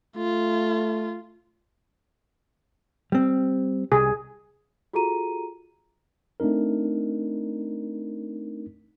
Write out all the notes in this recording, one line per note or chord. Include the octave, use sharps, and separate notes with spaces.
A3 F4
G3 C4
C2 G#4
F4 F#4 G#4 A4 A#5 D#7
A3 C4 D4 D#4 A#4